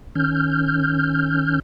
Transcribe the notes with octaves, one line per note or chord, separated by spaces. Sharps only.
D#3 C#4 F6 G6